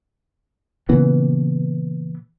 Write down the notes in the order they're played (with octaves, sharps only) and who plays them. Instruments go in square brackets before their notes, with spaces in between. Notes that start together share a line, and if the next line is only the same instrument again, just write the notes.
[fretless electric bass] A#2 C#3 E3 B3